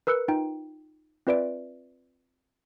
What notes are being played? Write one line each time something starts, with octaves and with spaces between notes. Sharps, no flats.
A#4 B4 E6 F#6 C#7
D#4 F4 G5
C4 F4 B4 D5 E5 D7